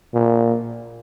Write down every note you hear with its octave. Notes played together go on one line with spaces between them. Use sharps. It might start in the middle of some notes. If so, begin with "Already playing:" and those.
A#2